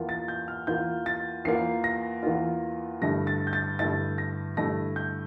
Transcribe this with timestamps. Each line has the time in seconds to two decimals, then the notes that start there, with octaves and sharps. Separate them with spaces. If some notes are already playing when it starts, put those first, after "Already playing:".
Already playing: E2 E3 A#3 F4
0.09 A6
0.28 G6
0.48 F6
0.67 E2 E3 A#3 F4 G6
1.06 A6
1.45 E2 E3 A#3 F4 C7
1.84 A#6
2.23 E2 E3 A#3 F4
3.01 G2 D3 A3 E4 A#6
3.27 A6
3.47 G6
3.53 A6
3.79 G2 D3 A3 E4 A6
4.18 A#6
4.57 G2 D3 A3 E4 A#6
4.96 G6